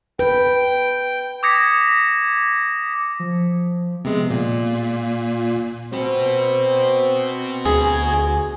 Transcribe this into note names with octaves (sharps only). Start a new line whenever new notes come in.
B4 G5
D6 D#6 G#6 A#6 B6 C#7
F3
C3 G#3 B3
A#2
F4
C4 F#4 B4
D2 G#4